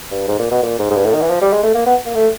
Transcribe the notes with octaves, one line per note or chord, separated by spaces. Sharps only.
G2
G#2
A#2
B2
A#2
G#2
G#2
G2
A2
D#3
E3
F3
G3
G#3
A3
A#3
B3
A#3
A3